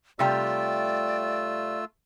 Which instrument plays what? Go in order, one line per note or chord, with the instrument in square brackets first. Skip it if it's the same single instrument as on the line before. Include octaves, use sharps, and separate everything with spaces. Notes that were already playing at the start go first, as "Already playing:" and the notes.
[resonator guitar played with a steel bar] C3 G3 G4 [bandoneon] A3 F4 E6 [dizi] D5